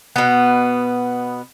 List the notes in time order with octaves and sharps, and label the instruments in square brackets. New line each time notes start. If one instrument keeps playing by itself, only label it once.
[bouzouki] B2 B3